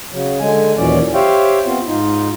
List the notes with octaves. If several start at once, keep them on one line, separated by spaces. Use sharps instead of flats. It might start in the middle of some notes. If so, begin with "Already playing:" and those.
C#3 F#3
D3 G#3 G#5
D#2 A#2 E3 F#3 C#4 D5
G4 C5 C#5 E5 F5 G5
B3 C4 F4
G#2 D#4 F4